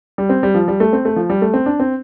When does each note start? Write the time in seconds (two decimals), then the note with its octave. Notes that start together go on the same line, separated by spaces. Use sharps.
0.18 G3
0.29 C4
0.43 G3
0.54 F3
0.68 G3
0.80 A3
0.93 C4
1.05 A3
1.16 F3
1.30 G3
1.42 A3
1.54 C4
1.66 D4
1.80 C4